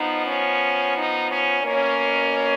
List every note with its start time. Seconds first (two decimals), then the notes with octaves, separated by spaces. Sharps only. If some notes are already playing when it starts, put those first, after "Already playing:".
Already playing: F3 B3 D#4
0.24 C#4
0.94 D#4
1.29 C#4
1.64 B2 A#3 C#4